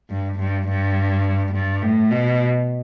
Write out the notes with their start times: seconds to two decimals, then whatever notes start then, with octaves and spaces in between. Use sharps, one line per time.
0.11 G2
0.39 G2
0.68 G2
1.54 G2
1.83 A2
2.11 B2